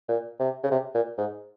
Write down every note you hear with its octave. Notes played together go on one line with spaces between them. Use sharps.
A#2
C3
C#3
C3
A#2
G#2